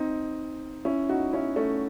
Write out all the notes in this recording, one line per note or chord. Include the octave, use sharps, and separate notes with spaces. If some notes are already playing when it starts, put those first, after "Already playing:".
Already playing: C4 D#4
C#4 E4
D#4 F#4
C#4 E4
A3 C#4